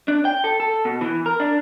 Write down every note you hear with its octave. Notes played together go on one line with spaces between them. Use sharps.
D4
G5
A4
A4
B2
E3
A#4
D4